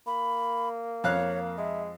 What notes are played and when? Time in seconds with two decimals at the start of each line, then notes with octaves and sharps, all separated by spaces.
0.07 A#3 B5
1.04 F2 C#5 F5 F#6
1.58 G#3 E5